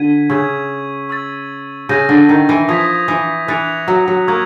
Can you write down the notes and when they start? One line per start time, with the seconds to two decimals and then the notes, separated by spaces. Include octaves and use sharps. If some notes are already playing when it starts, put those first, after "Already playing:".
Already playing: D3 G#6 B6 D#7
0.30 C#3 C#6 E6 G#6
1.09 C#6 E6 A6
1.89 C#3 G6 A#6 D#7
2.09 D3
2.29 D#3
2.49 E3
2.69 F3 D#6 G#6 B6
3.08 E3
3.48 E3 F#6 A6 C#7 F7
3.88 F#3
4.08 F#3
4.28 A#3 C#6 E6 G#6